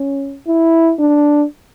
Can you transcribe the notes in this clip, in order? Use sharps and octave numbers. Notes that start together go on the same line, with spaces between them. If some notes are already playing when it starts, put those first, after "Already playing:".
Already playing: C#4
E4
D4